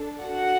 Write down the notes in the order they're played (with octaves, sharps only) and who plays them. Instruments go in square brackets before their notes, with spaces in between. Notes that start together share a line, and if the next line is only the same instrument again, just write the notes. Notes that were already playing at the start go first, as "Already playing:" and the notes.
Already playing: [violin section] D4 A4
F#4 F#5